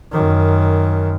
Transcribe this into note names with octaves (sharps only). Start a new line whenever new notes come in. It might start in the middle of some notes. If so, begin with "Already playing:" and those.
F#2 D#3